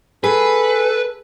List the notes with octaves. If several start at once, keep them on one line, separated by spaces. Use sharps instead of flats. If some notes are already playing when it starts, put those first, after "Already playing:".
G#4 A4 B4